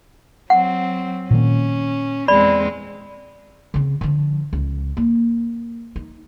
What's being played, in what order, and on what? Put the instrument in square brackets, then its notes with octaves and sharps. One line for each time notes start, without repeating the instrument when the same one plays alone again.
[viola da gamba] F#3 C4 [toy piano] F#5
[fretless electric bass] A#2 D#3 A#3 [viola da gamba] C#4
[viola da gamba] E2 G#3 C4 [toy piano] D5 B5
[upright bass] C#3 C4
D3 F3
C#2
A#3
D#4